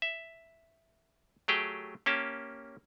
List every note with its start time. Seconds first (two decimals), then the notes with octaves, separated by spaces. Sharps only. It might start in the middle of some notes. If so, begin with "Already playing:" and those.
0.02 E5
1.48 F#3 A3 G4 G#4 G5
2.06 A#3 C#4 G4 A5